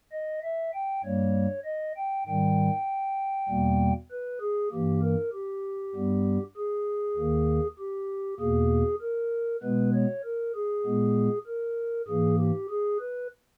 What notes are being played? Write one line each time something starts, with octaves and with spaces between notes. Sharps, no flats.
D#5
E5
G5
G2 G3 A#3 C#5
D#5
G5
G#2 D#3 G3 G5
E2 B2 G3 A#3
B4
G#4
G2 E3 A#3 G4
A#4
G4
G2 G3 B3
G#4
D#2 D#3 A#3
G4
E2 B2 A#3 G#4
A#4
B2 G#3 B3 B4
C#5
A#4
G#4
A#2 G#3 B3
A#4
G#2 E3 A#3 G#4
G4
G#4
B4